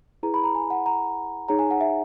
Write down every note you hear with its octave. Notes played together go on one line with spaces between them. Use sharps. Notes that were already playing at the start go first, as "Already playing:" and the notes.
E4 G#4 B4 A#5
B5
A#5
G#5
F#5
A#5
D#4 G#4 C#5 A#5
G#5
F#5
E5